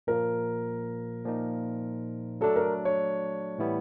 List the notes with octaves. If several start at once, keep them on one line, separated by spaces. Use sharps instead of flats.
A#2 F3 A#3 A#4
A#2 F3 A#3 D#4
F#3 A3 D4 A4
A#4
C#5
A2 E3 G3 B3 E4